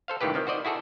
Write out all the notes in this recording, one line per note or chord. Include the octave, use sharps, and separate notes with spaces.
A4 C5 F5
C#2 A2 D#3 E3 G4 B4
C3 D#3 F3
F#4 C5 D5 D#5
E4 F#4 G#4 A4